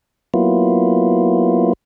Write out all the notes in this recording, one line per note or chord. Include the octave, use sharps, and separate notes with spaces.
F#3 A#3 B3 E4 F4